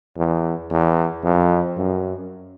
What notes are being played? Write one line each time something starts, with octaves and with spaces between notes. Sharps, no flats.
E2
E2
F2
F#2